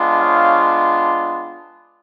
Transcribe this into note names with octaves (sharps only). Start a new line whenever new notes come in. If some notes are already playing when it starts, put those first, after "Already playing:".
Already playing: G#3 B3 D4 F4
C#5 F5